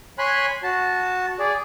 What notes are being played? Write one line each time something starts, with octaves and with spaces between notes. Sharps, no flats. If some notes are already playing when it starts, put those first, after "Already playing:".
C#5 G#5 B5 C6 F#6
F#4 A5
G#4 D5